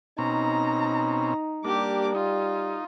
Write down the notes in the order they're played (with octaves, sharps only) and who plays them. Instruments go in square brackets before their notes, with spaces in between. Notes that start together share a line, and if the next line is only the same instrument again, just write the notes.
[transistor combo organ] B2 C4 C#4 [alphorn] D#4 [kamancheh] A#5
[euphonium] G3 [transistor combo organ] A#3 D4 [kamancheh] G4 D6
[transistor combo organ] D#4 [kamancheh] F4